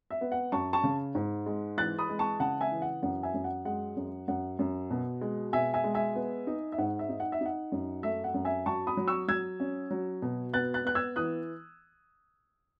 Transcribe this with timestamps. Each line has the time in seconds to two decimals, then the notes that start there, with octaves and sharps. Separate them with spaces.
0.11 E5
0.21 B3
0.32 F#5
0.52 F#2 A5 C#6
0.73 A5 C#6
0.84 C#3
1.15 G#2
1.46 G#3
1.77 E3 F#6 A6
1.99 B5 D#6
2.09 G#3
2.19 A5 C#6
2.40 C#3 F#5 A5
2.61 E5 G#5
2.72 E3
2.82 F#5
3.03 F#2 F#5
3.23 E5 G#5
3.34 F#2
3.44 F#5
3.65 G#3 F#5
3.96 F#2
4.28 F#2 F#5
4.59 F#2
4.91 B2
5.21 G#3
5.53 B2 E5 G#5
5.74 E5 G#5
5.84 G#3
5.94 E5 G#5
6.16 B3
6.47 D#4
6.72 E5
6.78 G#2 F#5
6.99 E5
7.09 D#4
7.20 F#5
7.32 E5
7.41 D#4 F#5
7.72 F#2
8.03 A3 E5
8.24 F#5
8.34 F#2
8.45 E5 G#5
8.66 F#3 A5 C#6
8.87 B5 D#6
8.97 F#3
9.08 C#6 E6
9.28 F#3 E6 G#6
9.60 C#4
9.91 F#3
10.22 B2
10.54 B3 F#6 A6
10.74 F#6 A6
10.85 B3 F#6
10.95 E6 G#6
11.16 E3 D#6 F#6